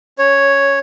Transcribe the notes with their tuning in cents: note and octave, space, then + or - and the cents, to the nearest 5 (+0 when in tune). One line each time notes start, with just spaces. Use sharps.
C#4 +15 C#5 +0